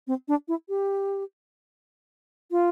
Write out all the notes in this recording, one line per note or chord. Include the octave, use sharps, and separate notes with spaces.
C4
D4
E4
G4
F4